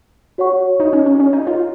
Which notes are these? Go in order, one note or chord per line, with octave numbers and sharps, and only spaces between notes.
F#4 C#5 F#5 C#6
D#4
C#4
C#4
C#4
D#4
F4